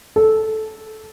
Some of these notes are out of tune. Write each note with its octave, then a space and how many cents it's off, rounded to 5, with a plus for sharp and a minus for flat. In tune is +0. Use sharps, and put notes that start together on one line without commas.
A4 -10